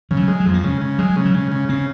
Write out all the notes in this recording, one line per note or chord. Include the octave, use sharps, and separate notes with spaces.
C#3 F3
F#3
G#3
F#3
F2
A#3
C#3 G#3
C#3
F#3 G#3
C#3
F#3
C#3 G#3
C#3
C#3 C4